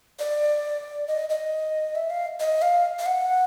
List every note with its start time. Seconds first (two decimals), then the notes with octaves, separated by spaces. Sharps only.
0.19 D5
1.07 D#5
1.30 D#5
1.95 E5
2.10 F5
2.40 D#5
2.62 F5
2.99 F5
3.06 F#5